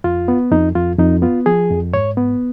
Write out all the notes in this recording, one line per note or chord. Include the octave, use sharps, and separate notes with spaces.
F2 F4
B3
F2 D#4
F2 F4
F2 D#4
B3 F4
F3 G#4
F2
G#2 C#5
B3